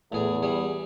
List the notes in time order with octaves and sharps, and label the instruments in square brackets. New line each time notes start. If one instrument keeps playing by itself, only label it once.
[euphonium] E2 [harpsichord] A2 G#4
[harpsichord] G3 G#4